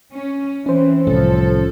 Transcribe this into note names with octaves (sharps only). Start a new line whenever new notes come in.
C#4
E3 C4 C#4 C5
C2 A2 F3 A4